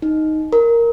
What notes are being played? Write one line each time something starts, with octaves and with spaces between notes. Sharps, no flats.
D#4
A#4